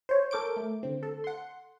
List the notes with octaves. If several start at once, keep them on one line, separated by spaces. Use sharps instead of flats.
C5 C#5
A4 A#4 D6 G6 D7
A3
D3 C4
A4
F#5 C6